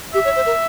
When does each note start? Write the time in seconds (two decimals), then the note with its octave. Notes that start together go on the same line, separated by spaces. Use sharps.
0.14 G4 E5
0.25 C#5
0.36 C5
0.46 A#4